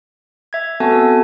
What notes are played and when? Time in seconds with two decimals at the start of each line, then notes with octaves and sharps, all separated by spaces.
0.53 E5 G#6
0.80 B3 C4 F#4 A4 G#5 A5